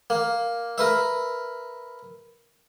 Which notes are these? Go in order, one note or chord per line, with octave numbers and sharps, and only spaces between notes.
A#3
A#4 B4 E5